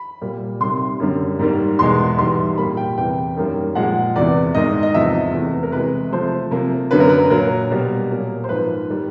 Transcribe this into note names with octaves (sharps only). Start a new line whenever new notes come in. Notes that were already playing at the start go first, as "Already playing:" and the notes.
Already playing: B5
A#2 G3 A#3
C3 D#3 G3 A#3 C6
F#2 D3 G3
G#2 D#3 G3 A#3
E2 B2 G#3 C6
G#2 E3 G3 C6
A#2 G3 A#3 B5
G5
E2 C3 E3 G5
F#2 D#3 G3 A#3
A#2 F3 G#3 F#5
E2 C3 E3 D5
G#2 D#3 G#3 D#5
D#5
E2 C3 F3 E5
E2 C3 E3 A3
A#4
C3 E3 G#3 B4
C3 F3 A3 C5
C3 F3 A#3
F#2 D3 F#3 A#3 B4
A#4
B4
A#2 F#3 A#3 A#4
B2 G3 A#3
A#2 F#3 A#3
C5
G#2 F3 A#3 B4
D#3 G3